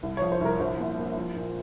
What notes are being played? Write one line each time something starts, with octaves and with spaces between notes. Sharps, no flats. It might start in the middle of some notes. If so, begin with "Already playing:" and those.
C2
F3 C#5
C5
C2 A#4
A#1 C5
A#3
A#3
F3
A#2